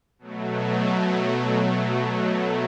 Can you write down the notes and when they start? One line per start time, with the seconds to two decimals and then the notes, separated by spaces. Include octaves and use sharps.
0.19 B2 F#3 A3